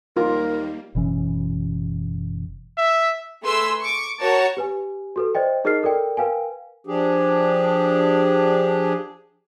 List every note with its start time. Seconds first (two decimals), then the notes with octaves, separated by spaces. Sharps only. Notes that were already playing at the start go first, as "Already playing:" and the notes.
0.17 D#2 G3 A#3 F4 A#4
0.95 F#1 B2 E3 C#4
2.78 E5
3.42 A3 G#4 B4 C6 E6
3.80 C#6 D6
4.19 F#4 A#4 C#5 A5
4.57 G4 B4 G#5
5.16 F#4 A4 B4
5.35 C5 D5 D#5 G5
5.64 D#4 G#4 A#4 D#5 F6 C7
5.83 A4 A#4 D5 G5
6.17 A#4 B4 F5 G5 G#5
6.87 F3 D4 G4 G#4